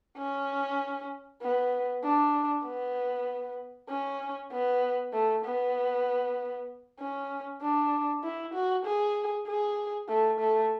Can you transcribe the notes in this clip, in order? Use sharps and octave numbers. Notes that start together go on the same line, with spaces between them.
C#4
B3
D4
B3
C#4
B3
A3
B3
C#4
D4
E4
F#4
G#4
G#4
A3
A3